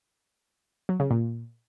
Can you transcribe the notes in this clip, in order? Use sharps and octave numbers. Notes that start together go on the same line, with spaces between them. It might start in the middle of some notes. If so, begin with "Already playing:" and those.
F#3
C#3
A#2